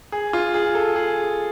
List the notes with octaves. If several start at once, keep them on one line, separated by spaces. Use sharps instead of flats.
G#4
F4
G#4
A4
G#4